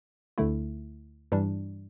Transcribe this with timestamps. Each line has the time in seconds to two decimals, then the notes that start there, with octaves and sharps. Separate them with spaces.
0.38 D2 D3 A3 E4
1.32 G2 E3 G3 D4